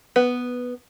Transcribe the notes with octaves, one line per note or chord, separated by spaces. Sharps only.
B3